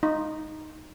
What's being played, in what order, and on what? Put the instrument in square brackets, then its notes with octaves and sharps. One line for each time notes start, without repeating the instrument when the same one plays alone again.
[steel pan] D#4